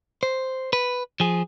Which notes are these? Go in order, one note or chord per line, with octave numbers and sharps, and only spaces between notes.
C5
B4
F3 G#4